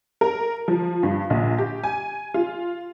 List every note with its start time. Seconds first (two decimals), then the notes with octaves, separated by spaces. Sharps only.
0.21 A#4
0.68 F3
1.03 G2
1.30 A#1
1.58 G4
1.84 G#5
2.34 F4